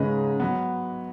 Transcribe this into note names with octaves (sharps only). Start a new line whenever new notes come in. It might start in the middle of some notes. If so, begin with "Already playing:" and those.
Already playing: G#2 C#3 G#3 C#4 B4 D#5
F#3 B3